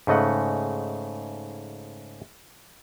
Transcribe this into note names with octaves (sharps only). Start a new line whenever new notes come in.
G#2 C#3 A3 D#5 F#5